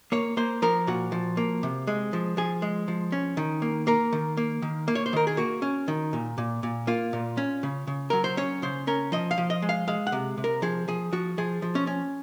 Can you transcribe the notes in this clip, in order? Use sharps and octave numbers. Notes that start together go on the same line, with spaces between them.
A#3 C#5
A#3 C5
F3 A#4
A#2 F#4
F3
A#3
C3
G#3
F3
F3 G#4
G#3
F3
C#4
D#3
A#3
A#3 A#4
D#3
A#3
D#3
A#3
C#5
C5
D#3 A#4
G#4
A#3 F#4
C#4
D#3
A#2
A#2
A#2
A#3 F4
A#2
C#4
C#3
C#3
F#3 A#4
C5
C#4 C#5
C#3 C5
C#4 A#4
F3 D#5
F5
F3
D#5
G#3
F5
G#3 F5
F#5
C3
C3
A#4
F3 G#4
F3 G#4
F3 F#4
F3 G#4
F3
C#4
C#4